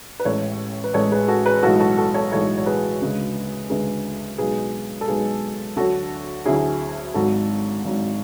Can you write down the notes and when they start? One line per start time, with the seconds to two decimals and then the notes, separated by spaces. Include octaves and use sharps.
0.20 B4
0.25 A1 A2 G#3 A4 C#5
0.84 B4
0.94 A1 A2 G#3 A4 C#5
1.12 G#4 B4
1.28 F#4 A4
1.45 G#4 B4
1.63 B1 A2 E3 G#3 F#4 A4
1.80 F#4 A4
1.97 F#4 A4
2.14 A4 C#5
2.31 B1 A2 E3 G#3 A4 C#5
2.57 C#5
2.66 G#4 B4
3.01 D2 C#3 G#3
3.69 D2 C#3 G#3 G#4 B4
4.38 B1 B2 G#3 G#4 B4
5.01 A4
5.07 B1 B2 G#3 G#4 B4
5.76 D2 D3 F#3 F#4 A4
6.45 D2 D3 F#3 E4 G#4
7.14 G#1 G#2 F#3 F#4 A4
7.84 G#1 G#2 F#3